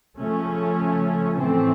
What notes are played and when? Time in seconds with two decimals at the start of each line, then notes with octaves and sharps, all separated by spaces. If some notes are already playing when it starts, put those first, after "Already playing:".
0.18 C#3 F3 A3 C#4
1.39 A2 E3 A3 C4